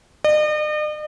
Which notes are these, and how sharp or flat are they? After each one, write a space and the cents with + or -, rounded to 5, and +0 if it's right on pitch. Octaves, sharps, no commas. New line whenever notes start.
D#5 -45